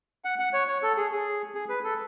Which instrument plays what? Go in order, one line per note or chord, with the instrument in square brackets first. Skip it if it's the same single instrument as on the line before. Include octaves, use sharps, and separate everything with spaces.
[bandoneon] F#5
F#5
C#5
C#5
A4
G#4
G#4
G#4
B4
A4